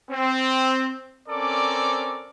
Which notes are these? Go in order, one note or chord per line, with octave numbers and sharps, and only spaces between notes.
C4
C4 C#4 A4 A#4 D5 D6